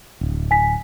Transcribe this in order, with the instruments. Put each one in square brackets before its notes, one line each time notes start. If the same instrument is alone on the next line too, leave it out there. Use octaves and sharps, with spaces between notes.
[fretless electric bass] D1
[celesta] G#5 B6